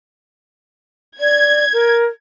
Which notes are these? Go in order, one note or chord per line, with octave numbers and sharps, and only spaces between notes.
D5 G#6
A#4